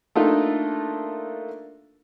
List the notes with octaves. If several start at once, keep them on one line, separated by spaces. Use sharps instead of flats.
A3 A#3 D4 D#4 F4 A4